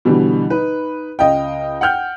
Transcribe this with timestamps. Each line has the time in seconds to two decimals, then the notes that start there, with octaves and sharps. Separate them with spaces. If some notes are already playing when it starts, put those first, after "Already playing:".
0.05 B2 D3 E3 G3
0.50 D#4 B4
1.19 C#2 D#5 F5 G5
1.81 F#5 G5 F6 G6